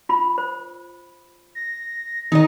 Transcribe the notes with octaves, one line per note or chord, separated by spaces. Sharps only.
F4 B5
C5
A#6
D#3 D#4 A#4 D#5